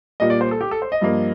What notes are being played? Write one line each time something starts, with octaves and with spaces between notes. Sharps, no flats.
A#2 G3 A#3 D#5
D5
C5
A4
G4
A4
C5
D#5
G2 F3 A#3